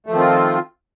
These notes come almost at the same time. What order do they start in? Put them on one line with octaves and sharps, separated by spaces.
A3 F3 D#3 C4 F4